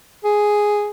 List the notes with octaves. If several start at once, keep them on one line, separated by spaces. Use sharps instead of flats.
G#4